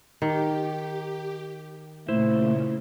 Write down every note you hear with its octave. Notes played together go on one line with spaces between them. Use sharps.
D#3 G4
A#2 C#3 A3 E4 C5